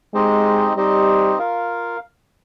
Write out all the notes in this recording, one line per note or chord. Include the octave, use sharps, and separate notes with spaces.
G#3 C4 D#4 G4 C5 D#5
G3 C4 D#4 G4 C5 D#5
F4 A#4 F5